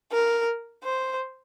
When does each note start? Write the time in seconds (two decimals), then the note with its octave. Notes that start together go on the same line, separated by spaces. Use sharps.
0.12 A#4
0.83 C5